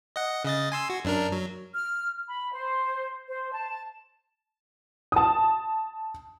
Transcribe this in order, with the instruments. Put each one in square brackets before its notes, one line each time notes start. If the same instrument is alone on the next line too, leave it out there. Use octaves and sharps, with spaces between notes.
[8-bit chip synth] D#5 F#5
C#3 D#5 A6
G#5 C6 E6
F#4
F#2 D4 A#4
F#3
[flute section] F6
B5
C5
C5
A5
[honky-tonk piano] A5 D#6